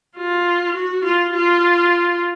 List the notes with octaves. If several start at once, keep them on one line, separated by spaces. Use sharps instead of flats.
F4
F#4
F4
F4